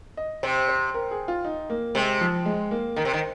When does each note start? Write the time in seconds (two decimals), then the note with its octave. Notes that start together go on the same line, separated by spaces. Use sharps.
0.17 D#5
0.43 C3 C5
0.68 C5
0.94 A#4
1.11 G#4
1.28 F4
1.45 D#4
1.70 A#3
1.95 C3 G#3
2.21 F3
2.46 G#3
2.71 A#3
2.96 D#3 A#4
3.05 C3
3.13 D#3